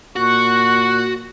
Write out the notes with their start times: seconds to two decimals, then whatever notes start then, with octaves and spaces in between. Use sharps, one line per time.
0.16 A#2 F#4 C#6 F#6